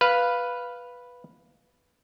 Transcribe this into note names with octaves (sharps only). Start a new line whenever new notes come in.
B4 F5